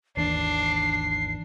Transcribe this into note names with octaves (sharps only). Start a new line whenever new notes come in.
G#1 D#2 E3 D4 C7